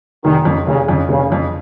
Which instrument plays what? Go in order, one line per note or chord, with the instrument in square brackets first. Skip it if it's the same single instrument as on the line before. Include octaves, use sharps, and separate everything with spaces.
[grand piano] F1 [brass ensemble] D#3
[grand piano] F2 C#3
[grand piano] F1 [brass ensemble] C#3
[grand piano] F2 C#3
[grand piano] F1 [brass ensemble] C#3
[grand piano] F2 C#3